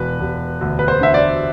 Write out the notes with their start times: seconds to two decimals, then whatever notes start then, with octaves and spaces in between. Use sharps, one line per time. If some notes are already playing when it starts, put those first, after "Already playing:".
Already playing: E1 B4
0.20 E1
0.61 D2
0.79 B4
0.88 C5
1.01 D3 E5
1.14 D5